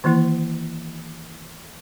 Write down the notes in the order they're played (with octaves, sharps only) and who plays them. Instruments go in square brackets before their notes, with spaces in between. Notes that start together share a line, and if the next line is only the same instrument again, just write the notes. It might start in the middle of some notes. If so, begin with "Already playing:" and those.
[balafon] D#3 E3 A#3 E4